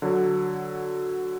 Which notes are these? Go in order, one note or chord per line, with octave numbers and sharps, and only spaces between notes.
D3 F#3